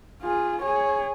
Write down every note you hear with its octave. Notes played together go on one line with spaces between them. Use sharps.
F4 G#4
G#4 C#5